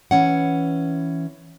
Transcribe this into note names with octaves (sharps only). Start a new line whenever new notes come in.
E3 C#4 F#5